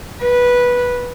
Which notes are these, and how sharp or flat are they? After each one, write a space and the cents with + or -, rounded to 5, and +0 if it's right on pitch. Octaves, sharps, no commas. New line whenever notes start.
B4 -10